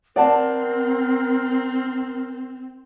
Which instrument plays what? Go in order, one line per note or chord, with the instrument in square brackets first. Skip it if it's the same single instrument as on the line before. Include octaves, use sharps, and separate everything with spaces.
[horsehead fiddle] C4 [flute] A#4 [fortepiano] D5 F#5 A5